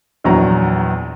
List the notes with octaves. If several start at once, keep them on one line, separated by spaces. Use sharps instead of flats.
A#1 E2 F#3 A#5